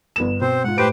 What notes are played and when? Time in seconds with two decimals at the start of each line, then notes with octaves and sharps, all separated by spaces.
0.16 G1 B3 E7
0.41 B2 C4 C5
0.64 G#2 F4 F#5
0.78 A2 G4 B4 C5 D7